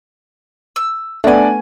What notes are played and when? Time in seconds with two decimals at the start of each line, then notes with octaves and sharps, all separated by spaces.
0.76 E6
1.24 A3 B3 C#4 D4 D5 G#5